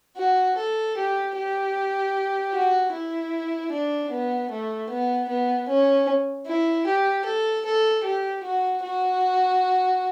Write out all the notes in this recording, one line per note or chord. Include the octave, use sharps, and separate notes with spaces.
F#4
A4
G4
G4
F#4
E4
D4
B3
A3
B3
B3
C#4
E4
G4
A4
A4
G4
F#4
F#4